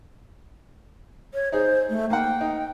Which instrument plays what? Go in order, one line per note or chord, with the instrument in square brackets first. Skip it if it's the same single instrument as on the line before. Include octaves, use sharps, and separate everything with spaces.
[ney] C#5
[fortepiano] D#4 G#4 [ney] C5
[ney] A3
[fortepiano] A#3 F#5 [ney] G5
[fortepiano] D#4